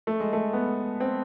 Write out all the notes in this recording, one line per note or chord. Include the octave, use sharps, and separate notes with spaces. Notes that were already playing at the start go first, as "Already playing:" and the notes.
A3
G#3
A3
B3
C4